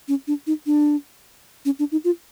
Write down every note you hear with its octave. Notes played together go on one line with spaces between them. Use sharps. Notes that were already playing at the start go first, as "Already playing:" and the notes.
C#4
D4
D#4
D4
C#4
D4
D#4
F4